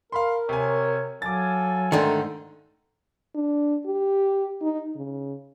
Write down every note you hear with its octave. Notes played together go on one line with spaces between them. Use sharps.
A#4 F5 B5 C6
C3 C#5 G#5
F#3 A4 F5 G#5 D6 A6
G#2 D3 D#3 A3 A#5 C6
D4
G4
D#4
C#3